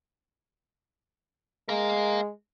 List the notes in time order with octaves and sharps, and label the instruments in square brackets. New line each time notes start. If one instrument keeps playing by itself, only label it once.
[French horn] G#3 [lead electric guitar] A#4 F5